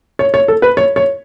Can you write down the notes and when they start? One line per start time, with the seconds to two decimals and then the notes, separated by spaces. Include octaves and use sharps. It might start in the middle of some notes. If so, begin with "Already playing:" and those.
0.19 C#5
0.34 C#5
0.48 A4
0.62 B4
0.77 C#5
0.96 C#5